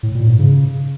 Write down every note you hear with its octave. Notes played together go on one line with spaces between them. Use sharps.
A2
A#2
G#2
C#3